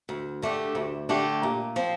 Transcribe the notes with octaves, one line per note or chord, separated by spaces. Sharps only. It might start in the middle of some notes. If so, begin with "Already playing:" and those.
D2
D3 A3 D4 G4
D2
D3 A3 D4 G4
A#2
F3 C4